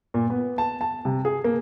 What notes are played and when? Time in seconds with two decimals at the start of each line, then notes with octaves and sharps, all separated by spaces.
0.14 A#2
0.30 B3
0.58 A5
0.81 A5
1.05 C3
1.25 G#4
1.44 A#3